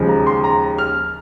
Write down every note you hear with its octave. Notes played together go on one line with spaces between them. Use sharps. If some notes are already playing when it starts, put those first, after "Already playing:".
Already playing: D#2 C#3 F3 G#3
A#5
C6
A#5
F6